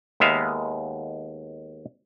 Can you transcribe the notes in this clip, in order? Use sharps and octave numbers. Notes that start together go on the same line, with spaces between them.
D#2 G#3 B3 E5 F5